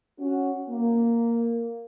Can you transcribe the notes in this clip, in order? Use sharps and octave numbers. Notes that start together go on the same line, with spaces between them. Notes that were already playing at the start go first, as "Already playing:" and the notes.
C#4 F#4
A#3